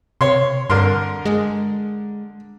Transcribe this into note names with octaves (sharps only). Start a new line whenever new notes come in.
C3 C#5 C6
G2 D3 A#4 C6
G#3